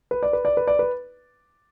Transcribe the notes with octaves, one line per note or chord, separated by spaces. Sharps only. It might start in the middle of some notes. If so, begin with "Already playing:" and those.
B4
D5
B4
D5
B4
D5
B4